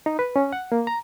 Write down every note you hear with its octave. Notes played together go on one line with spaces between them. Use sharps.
D#4
B4
C#4
F#5
A#3
A#5